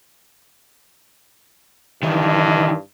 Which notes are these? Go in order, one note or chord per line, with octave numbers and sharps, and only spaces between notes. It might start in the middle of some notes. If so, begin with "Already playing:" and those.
G2 D#3 E3